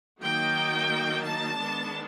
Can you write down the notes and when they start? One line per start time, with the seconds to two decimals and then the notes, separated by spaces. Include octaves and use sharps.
0.22 D#3 F#3 A#3 D#4 G5
1.24 A5
1.57 D#3 G#3 B3 D4